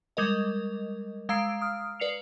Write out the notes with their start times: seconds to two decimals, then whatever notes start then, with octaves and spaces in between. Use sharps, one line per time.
0.17 G3 G#3 A#4 D#5
1.29 G#3 F5 A#5 E6 C7 D7
1.61 D#6 F6
2.00 B4 D5 C7 C#7 F7